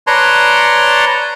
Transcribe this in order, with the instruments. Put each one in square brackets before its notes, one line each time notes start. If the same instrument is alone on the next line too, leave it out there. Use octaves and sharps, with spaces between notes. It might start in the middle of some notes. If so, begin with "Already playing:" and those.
[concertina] B4 C#5 D5 A5 A#5 C6